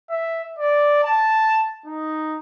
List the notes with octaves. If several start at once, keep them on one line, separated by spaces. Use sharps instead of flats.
E5
D5
A5
D#4